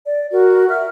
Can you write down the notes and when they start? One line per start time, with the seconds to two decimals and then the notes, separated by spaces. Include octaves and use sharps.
0.05 D5
0.32 F#4 A#4
0.70 E5 F6